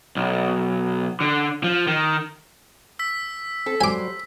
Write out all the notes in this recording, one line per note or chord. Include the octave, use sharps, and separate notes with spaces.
B1
D3
F3
D#3
E6 B6
C4 A4
F#3 G3 C5 G#5 D6